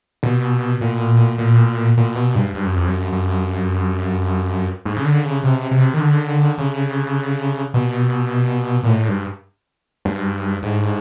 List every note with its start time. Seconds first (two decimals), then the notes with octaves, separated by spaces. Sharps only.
0.23 B2
0.81 A#2
1.38 A#2
1.97 A#2
2.15 B2
2.35 G2
2.54 G2
2.65 F#2
2.76 F2
2.88 F#2
3.12 F#2
4.85 G#2
4.97 C#3
5.05 D3
5.24 C#3
5.43 C3
5.71 C3
5.94 D#3
6.01 D3
6.58 C#3
7.74 B2
8.83 A#2
8.89 A2
9.08 G2
10.05 G2
10.62 G#2